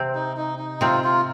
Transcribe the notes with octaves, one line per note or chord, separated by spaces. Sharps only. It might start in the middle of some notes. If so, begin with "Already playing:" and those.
Already playing: C3 C4
D#4
D#4
D#4
C3 C4 F4
F4